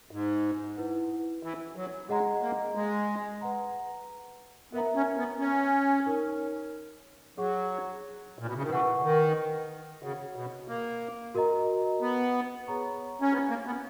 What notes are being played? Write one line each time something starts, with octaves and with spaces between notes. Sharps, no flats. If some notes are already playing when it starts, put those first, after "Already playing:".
G#2
E4 B4 F#5
E3
F#3
G#3 G#4 D#5 F#5 A#5
A#3
G#3
B4 F#5 A#5
B3 A#4 E5 A#5
C#4
B3
C#4
D#4 A#4 C#5
F#3 G#4 C#5 F#5 C#6
A#2
B2
C#3
D#3
E3 B4 F#5 C#6
D#3
C#3 F#4 C#5 F#5
B2
A#3
F#4 A#4 D#5 A#5
B3
G#4 C#5 F#5 A#5 C#6
C#4
B3
A#3
B3